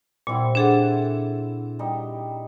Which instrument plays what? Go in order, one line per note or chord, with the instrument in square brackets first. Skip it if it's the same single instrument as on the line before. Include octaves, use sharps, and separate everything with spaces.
[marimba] A#2 [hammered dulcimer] G3 C4 E4
[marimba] D4 G#4 A4 [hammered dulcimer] F#5
[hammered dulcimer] G3 D#4